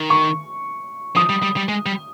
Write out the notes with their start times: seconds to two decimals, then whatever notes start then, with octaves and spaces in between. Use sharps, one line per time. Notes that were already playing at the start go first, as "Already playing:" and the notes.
Already playing: D#3
0.10 C#6
1.16 F3 D#6
1.29 G3
1.42 G3
1.56 G3
1.68 G#3
1.86 G3